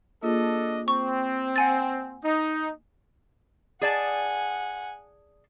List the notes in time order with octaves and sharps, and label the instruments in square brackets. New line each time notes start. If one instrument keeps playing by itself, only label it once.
[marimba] A#3 F4 G#4 [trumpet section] D4 A4 D#5
[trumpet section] C4 [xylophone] C#6
[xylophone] F#5 G#5 A6
[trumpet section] D#4
[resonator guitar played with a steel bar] G#4 D5 A5 [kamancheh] F#5 G#5